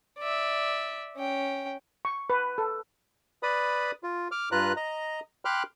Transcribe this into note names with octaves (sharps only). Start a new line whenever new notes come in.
D5 E5
C#4 G5
C#6
B4
A4
B4 D5 B5 D#6
F4
D6 F6
G2 F4 B4 A#5 F#6
D#5 A#5
G5 B5 C6 D6 F6 F#6